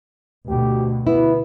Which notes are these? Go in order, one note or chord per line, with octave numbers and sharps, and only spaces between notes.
D2 B2 G4
B3 E4